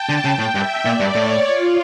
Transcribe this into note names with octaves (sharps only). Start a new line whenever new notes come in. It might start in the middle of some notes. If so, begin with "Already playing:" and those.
Already playing: G5 A5
D3
C#3 G5
A2
G2 E5
A#2 D5
G2
A2 C#5
F4